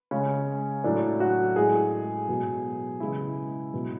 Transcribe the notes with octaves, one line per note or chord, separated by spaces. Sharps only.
C#3 G#3 C#4
A2 F#3 D4
F#4
A2 G#3 G#4
B2 F#3
C#3 E3 G#3 E4
B2 F#3